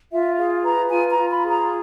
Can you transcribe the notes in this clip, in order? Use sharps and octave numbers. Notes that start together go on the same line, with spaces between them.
F4 E5
G#4 F5
B4 A#5
F4 G#5
A#5
F4
B5
G#4
A#5